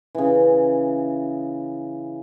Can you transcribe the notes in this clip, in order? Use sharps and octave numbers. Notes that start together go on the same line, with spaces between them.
C#3 E3